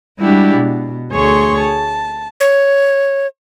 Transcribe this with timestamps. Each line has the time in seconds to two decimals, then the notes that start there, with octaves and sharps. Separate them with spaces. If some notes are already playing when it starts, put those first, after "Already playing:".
0.19 G3 G#3 D4 E4 F#4 G4
0.57 B2
1.12 D2 A3 G#4 C#5 C6 C#6
1.57 A5
2.40 C#5